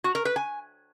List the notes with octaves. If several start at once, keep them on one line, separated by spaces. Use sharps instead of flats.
F#4
A#4
B4
G#5